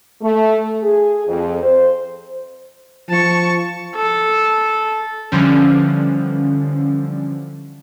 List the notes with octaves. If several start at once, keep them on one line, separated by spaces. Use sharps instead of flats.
A3
G#4
F2
C5
F3 A5 C#6
A4
D3 E3 F3 G3 C#4